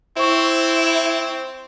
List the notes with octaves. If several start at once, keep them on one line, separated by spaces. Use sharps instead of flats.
C4 E4 C5 C#6